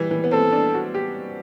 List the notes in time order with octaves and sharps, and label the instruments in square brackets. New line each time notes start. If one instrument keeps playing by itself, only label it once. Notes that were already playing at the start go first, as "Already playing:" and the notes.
Already playing: [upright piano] E3 G3
E3
B3
[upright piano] C4 [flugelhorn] A4
[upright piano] D4
F#4
G4